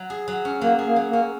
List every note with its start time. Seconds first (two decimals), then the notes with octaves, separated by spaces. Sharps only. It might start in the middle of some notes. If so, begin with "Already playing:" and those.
Already playing: F#3
0.10 G#4
0.28 F#3
0.45 C#4
0.61 F#3 A#3
0.79 G#4
0.86 A#3
0.96 F#3
1.09 A#3 C#4